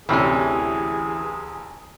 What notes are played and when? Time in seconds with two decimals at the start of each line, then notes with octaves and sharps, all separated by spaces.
0.09 A1 D2 C3 E3 C#4 G#4